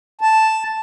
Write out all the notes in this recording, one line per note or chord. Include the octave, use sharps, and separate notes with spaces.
A5